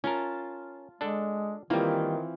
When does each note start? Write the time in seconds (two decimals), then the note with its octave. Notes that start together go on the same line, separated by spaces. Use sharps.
0.04 C#4 F4 A#4 A5
1.01 G#3 D4 A4
1.70 D#3 E3 G3 A#3 C4 F4